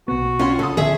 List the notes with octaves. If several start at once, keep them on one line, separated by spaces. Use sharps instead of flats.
B1 B3 F#4
C#4 F4 F#5 C6
C#3 A4 D#6
C2 D3 E3 G#4 E5